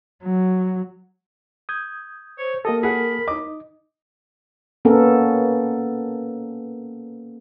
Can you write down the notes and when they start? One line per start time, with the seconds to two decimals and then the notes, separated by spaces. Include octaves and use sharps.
0.24 F#3
1.69 D#6 G6 G#6
2.38 C5 C#5
2.65 A#3 G4 A4 A#4 D#5
2.83 G#4 F#5 B5
3.28 D#4 D#5 D6
4.85 A#3 B3 C#4 A4 A#4